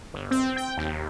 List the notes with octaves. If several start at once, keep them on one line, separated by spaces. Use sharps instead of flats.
G1
C4
G5
D#2